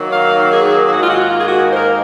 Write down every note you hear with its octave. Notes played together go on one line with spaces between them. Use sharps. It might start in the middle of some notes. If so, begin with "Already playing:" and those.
Already playing: D#3 F#3 A#3
F5
G#4
G#2 D#3 A#3 F#4
F4
F#4
F4
G#4
F#4
C5
A#4